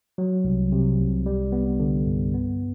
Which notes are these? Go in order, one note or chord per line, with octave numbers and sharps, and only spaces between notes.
F#3
C2
C3
C2
G3
B3
D3
G2
B3